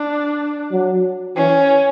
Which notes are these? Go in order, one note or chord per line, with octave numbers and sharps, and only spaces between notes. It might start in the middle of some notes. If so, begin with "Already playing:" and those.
Already playing: D4
F#3
E3 C#4